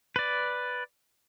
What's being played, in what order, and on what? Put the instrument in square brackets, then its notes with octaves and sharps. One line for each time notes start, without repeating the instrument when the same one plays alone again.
[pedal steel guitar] B4 D5